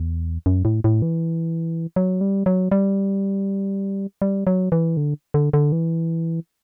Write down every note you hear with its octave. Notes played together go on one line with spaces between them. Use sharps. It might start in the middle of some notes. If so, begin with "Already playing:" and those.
Already playing: E2
F#2
A2
A2
E3
F#3
G3
F#3
G3
G3
F#3
E3
D3
D3
D3
E3